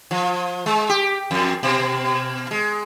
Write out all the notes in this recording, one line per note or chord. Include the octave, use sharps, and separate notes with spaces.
F3
G#3
G4
F2
B2
G#3